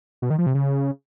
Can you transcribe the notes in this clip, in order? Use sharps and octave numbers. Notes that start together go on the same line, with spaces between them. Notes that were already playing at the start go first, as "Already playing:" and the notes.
B2
D#3
F3
C3
C#3